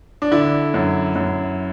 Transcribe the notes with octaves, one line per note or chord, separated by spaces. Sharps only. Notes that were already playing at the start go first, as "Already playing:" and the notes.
D4
D3 E4
F#2
F#2